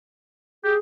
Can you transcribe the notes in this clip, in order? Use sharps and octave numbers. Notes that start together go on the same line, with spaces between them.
G4 G#4